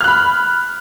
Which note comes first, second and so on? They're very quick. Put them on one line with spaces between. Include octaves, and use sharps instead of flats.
F6 F#6 B5